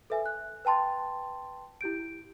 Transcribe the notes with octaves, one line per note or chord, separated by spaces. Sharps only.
A4 B4 E5 G#5
F#6
B4 G5 A5 C6 A6
E4 G4 G6 D7